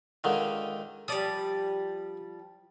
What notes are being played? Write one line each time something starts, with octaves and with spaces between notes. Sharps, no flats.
C#2 D3 D#3
F3 G3 D5 D#6